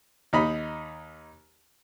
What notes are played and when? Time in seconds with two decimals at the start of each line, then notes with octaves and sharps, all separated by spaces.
0.33 D#2 D#4 B5